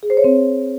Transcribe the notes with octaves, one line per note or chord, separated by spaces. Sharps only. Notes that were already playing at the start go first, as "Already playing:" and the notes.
G#4
C5
C#5
C4